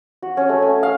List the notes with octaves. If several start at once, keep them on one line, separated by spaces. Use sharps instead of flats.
F#4
C#4
A3
G#5
F5